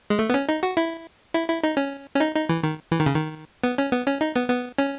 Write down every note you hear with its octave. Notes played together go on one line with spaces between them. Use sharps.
G#3
A3
B3
C#4
D#4
F#4
E4
E4
E4
D#4
C#4
C#4
D#4
D#4
E3
D#3
E3
D#3
C#3
D#3
B3
C#4
B3
C#4
D#4
B3
B3
C#4